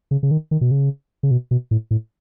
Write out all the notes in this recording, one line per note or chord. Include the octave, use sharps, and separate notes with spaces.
C#3
C#3
D#3
D#3
B2
C#3
C#3
B2
B2
A2
A2